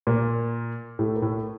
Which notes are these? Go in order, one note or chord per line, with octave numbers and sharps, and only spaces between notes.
A#2 A#3
A2 A3
A#3
A2 A3